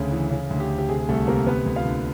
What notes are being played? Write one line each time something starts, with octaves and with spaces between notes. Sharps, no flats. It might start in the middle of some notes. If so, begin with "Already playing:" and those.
Already playing: D2 C#3
E3
C#3
D2
G4
D2
G4
C3 G#4
G#4
C2 A3 A4
C3 A#3 A#4
D2 B3 B4
D2
F4 F5
D3